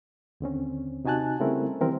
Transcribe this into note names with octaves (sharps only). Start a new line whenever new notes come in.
D#2 D3 C4 C#4
C3 D#4 F#4 G#5 A5 F#6
C#3 G3 A3 C4 E4 A#4
D#3 E3 G3 C4 A#4